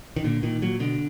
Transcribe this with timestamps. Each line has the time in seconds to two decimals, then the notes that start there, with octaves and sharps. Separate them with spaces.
0.16 D#3
0.24 A#2 D3
0.43 A#2 D#3
0.62 A#2 F#3
0.80 B2 D3